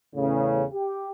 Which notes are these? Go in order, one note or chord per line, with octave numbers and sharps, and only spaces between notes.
E2 A2 C#3
G4